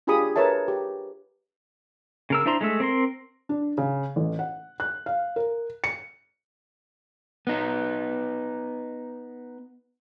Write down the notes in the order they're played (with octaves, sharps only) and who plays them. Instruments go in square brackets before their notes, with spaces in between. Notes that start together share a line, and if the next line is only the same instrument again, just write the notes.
[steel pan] D4 F4 G4 G#4 B5 D#6
A#4 B4 C#5 E5 A5
G4
[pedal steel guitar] C#3 A#4 E6
D4 E4 C5 A#5 C6
G#3 A3 E5
C4 A#4 C6
[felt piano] D4
C#3
A1
F#5
F#6
F5
A#4
C#7
[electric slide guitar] B3 D#4